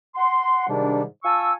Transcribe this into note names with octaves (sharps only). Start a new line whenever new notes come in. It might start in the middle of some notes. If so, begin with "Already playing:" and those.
F#5 C6
G#2 C3 D#3 G3 D4
F4 G#5 A5 C#6 E6